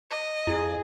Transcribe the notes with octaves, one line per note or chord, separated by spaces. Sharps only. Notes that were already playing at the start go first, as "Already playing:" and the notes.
D#5
F2 E4 G#4